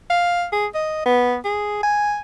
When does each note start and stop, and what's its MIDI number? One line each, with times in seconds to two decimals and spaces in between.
0.10 0.45 77
0.52 0.67 68
0.75 1.02 75
1.06 1.36 59
1.45 1.81 68
1.83 2.21 80